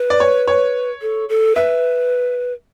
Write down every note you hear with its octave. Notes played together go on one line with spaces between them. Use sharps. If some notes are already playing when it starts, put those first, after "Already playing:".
Already playing: B4
D5
C#5
C#5
A4
A4
B4 E5